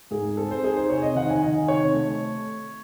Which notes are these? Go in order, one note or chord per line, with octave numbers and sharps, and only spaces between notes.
G#2 G#4
C4 A4
C5
D#4 G#4
C5
C3 C#5
D#5
D#3 F#5
G#5
D#3 D#5
C3 C#5
A3